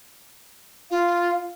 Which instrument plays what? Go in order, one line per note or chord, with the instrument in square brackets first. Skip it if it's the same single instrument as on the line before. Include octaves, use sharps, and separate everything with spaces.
[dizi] F4 [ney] F5